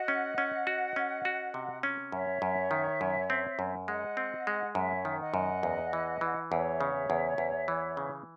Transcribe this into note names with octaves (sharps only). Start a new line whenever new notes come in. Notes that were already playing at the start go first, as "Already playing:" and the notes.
Already playing: F#4 D#5 F#5
C#4
C#4
F#4
C#4
F#4
C3
C#4
F#2 C#5 E5
F#2
D#3
F#2
C4
F#2
G#3 D#5 F#5
C4
G#3
F#2 C#5 E5
D#3
D#5 F#5
F#2
E2
E3
E3
E2 C#5 E5
C#3
E2
E2
E3
C#3